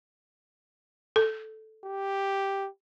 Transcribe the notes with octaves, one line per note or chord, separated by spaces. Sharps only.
A4
G4